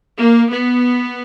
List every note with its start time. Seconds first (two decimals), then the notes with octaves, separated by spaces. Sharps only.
0.20 A#3
0.51 B3